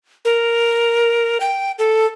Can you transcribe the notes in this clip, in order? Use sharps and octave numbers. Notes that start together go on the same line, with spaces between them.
A#4
G5
A4